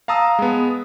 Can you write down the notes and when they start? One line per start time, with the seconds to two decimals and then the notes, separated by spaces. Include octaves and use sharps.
0.08 F5 A5 A#5 D#6 E6
0.39 G#3 B3